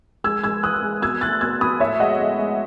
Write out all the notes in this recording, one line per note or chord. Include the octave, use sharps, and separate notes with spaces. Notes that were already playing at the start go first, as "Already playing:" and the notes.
G#3 E6 G#6
G#3 E6 G#6
E3 D#6 F#6
G#3
B2 E6 G#6
A3 F#6 A6
B2 E6 G#6
B2 B5 D#6
A2 C#5 E5
G#3 D#5 F#5
G#3
G#3